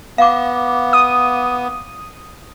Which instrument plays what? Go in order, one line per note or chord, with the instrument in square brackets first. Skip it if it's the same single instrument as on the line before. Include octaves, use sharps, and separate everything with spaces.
[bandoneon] B3 [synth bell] F5 D6
[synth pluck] D#6